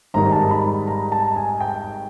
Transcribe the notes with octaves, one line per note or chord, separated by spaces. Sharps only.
G#1 G#2 D#3 G3 A#5
A5
B5
A#5
A5
G#5
G5